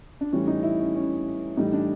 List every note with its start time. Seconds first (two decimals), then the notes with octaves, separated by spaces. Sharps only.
0.21 D4
0.32 A2 E3 G3 C#4
0.47 D#4
0.63 E4
0.80 C#4
0.95 C#4
1.57 A2 E3 G3 D#4
1.73 D4